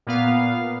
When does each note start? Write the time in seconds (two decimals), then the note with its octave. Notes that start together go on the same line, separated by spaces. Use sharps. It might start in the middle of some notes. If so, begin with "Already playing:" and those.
0.07 A#2 B3 F5